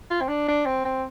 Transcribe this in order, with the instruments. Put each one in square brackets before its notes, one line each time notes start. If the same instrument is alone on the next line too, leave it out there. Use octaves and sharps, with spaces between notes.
[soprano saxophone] F4
C4
D4
D4
C4
C4